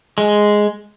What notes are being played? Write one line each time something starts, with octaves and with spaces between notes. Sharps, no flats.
G#3